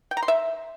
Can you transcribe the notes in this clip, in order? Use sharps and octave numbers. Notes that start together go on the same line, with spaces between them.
G5
A#5
C6
E5